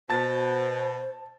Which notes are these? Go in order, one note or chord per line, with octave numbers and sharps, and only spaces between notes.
B2 C5 A5 A6